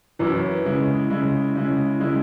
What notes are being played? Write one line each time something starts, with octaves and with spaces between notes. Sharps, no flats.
F#2 E3 C#4 E4
C#3 G#3 E4
C#3 G#3 E4
C#3 G#3 E4
C#3 G#3 E4